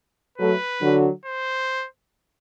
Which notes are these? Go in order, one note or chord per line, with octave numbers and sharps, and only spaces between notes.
F#3 A3 B4
D3 F#3
C5